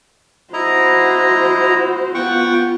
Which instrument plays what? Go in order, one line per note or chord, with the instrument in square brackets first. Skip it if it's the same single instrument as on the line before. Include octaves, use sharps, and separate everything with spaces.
[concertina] E4 D#5 A#5 [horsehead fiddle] F#4 C5
[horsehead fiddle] B3 F4 [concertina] F#5 G5 C#6